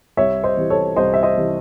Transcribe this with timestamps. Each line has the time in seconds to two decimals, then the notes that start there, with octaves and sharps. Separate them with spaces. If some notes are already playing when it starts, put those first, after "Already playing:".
0.17 C2 C#5 E5
0.43 C5 D#5
0.57 C3 E3
0.70 A4 C#5
0.96 C2 C5 D#5
1.14 E5
1.23 C5 D#5
1.36 C3 E3